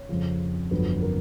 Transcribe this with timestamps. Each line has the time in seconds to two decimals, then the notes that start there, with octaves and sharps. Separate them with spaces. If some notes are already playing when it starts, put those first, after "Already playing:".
Already playing: C#5
0.09 F2 C#3 F3
0.71 G1 F2 D3 F#3 B4
1.02 A#4